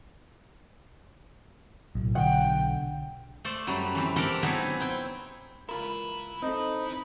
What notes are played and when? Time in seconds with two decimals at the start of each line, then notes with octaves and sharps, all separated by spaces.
1.95 B1 A2
2.15 D3 F#5 G5
3.44 A3 A4 C5 D5
3.67 F#2 F#3 G3
3.95 E3 C4
4.16 C4 D4 G4 A4 A#4 D5
4.43 F#3 B3 C4 D#4 E4 G#4
4.80 C4 E4 G5
5.69 C#2 E4 F4 A#4 B4
6.42 C4 D#4 A4